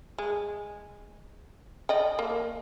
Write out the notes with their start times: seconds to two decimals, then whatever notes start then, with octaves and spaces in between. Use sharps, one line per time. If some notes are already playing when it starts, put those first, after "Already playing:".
0.18 G#3
1.89 D5 D#5 G5
2.19 A#3